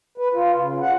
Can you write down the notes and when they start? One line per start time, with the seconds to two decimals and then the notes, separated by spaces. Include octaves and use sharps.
0.18 B4
0.34 F4
0.56 C#3
0.81 F#5